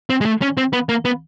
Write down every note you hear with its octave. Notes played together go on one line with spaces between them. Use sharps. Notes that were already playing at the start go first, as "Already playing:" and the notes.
C4
G#3
A3
C#4
C4
B3
A#3
B3